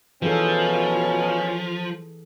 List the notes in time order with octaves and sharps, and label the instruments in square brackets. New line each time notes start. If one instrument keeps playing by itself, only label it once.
[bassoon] B2 [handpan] E3 G#4 A4 [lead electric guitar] F3 [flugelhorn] C#4